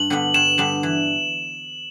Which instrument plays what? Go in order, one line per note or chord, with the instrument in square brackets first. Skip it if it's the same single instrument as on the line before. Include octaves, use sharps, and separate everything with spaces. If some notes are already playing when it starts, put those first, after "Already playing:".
Already playing: [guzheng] G2 [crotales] F#7
[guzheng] D3 G3 B3 D4
[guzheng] G2 [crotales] E7
[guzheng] D3 G3 B3 D4
E3